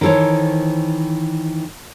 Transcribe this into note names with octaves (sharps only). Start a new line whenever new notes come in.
D#3 E3 A4 C5 C#5